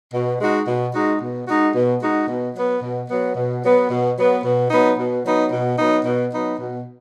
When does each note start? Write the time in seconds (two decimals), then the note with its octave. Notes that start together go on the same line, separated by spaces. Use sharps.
0.13 B2
0.39 G#3 D#4 F#4
0.66 B2
0.93 G#3 D#4 F#4
1.20 B2
1.47 G#3 D#4 F#4
1.73 B2
2.01 G#3 D#4 F#4
2.28 B2
2.55 F#3 B3
2.82 B2
3.09 F#3 B3
3.35 B2
3.63 F#3 B3
3.90 B2
4.16 F#3 B3
4.43 B2
4.70 F#3 B3 D#4
4.98 B2
5.24 F#3 B3 D#4
5.51 B2
5.78 F#3 B3 D#4
6.05 B2
6.32 F#3 B3 D#4
6.58 B2